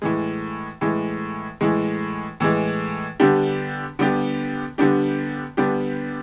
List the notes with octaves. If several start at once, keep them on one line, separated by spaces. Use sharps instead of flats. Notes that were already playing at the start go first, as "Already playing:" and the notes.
A2 E3 G#3
A2 E3 G#3
A2 E3 G#3
A2 E3 G#3
D3 G3 B3 D4 G4
D3 G3 B3 D4 G4
D3 G3 B3 D4 G4
D3 G3 B3 D4 G4